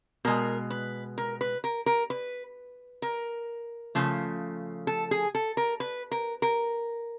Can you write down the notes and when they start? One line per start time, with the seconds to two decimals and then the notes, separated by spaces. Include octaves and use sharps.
0.25 B2 G#3 A#4
0.70 B4
1.18 A#4
1.41 B4
1.64 A#4
1.86 A#4
2.10 B4
3.02 A#4
3.95 C#3 F3 A3
4.87 A4
5.11 G#4
5.35 A4
5.57 A#4
5.80 B4
6.11 A#4
6.42 A#4